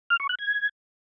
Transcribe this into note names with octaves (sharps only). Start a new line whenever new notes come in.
F6
C#6
F#6
G#6